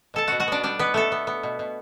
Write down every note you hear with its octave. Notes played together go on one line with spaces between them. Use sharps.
B2 A4 A5
B2 F#4 F#5
F#4 F#5
B3 D4 D5
G3 D4 D5
B2 B3 B4
A3 B3 A4
B3
B3
B2
B2